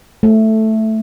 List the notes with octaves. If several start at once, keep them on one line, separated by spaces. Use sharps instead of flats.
A3